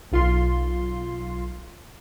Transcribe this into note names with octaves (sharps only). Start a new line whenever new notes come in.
B1 F4 C6